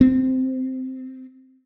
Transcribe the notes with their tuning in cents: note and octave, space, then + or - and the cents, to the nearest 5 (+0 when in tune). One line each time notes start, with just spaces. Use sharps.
C4 -10